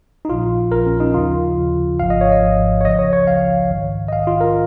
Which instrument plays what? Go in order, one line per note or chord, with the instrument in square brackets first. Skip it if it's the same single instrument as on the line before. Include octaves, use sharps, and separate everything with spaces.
[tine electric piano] D#4
A#1 A#2 F3 F4
A#1 A#2 F3 A#4
C#4
D#4
D#2 C#3 F3 F4
D#2 C#3 F3
G#1 G#2 F3 F5
D#5
C#5
D#5
G#1 G#2 F3
C#5
C#2 C#3 F3 D#5
C#5
C#5
C#2 C#3 F3 F5
A#1 G#2 D#3
D#5
A#1 G#2 D#3 F5
F4
A#4